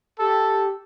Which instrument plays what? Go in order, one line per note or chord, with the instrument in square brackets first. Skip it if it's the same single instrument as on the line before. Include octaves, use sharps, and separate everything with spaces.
[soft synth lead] G4 [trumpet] A4